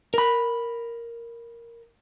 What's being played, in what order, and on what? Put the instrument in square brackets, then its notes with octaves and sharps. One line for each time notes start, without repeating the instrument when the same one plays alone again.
[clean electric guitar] A#4 B5